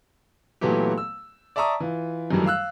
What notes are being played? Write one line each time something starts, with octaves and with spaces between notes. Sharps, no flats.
A#2 E3 F#3 A3 B3 G4
E6
D5 E5 A5 A#5 C#6 D#6
E3 F4
F#2 D#3 E3 F#3 G3 A3
F5 E6 F#6